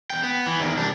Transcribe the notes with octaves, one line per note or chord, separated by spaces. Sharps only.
E2 G5
B3
E3
E2 D#3
C2 D4